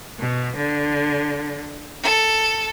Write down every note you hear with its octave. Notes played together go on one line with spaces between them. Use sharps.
B2
D3
A4